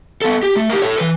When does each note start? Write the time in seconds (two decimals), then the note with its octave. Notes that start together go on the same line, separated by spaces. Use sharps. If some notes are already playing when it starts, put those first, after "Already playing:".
0.21 B3 A4
0.43 G4
0.56 A3
0.69 G4 A#4
0.82 A4 C#5
0.98 E3 B4